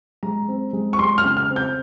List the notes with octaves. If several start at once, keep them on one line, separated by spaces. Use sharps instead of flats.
G#3 A#5
C4
G#3
C#6
G#3 C6
F6
C#3
F6
C4
G6